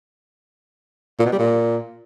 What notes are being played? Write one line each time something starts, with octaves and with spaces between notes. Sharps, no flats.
A#2
B2
G3
A#2